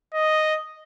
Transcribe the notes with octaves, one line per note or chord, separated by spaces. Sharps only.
D#5